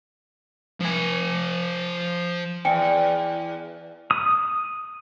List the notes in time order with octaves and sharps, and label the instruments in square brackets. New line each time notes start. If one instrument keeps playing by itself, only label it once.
[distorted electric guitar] F3 G#5
[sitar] E2 [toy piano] G5 G#5
[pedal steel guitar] D#6